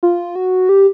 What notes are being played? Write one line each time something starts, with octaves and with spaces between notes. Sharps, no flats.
F4
F#4
G4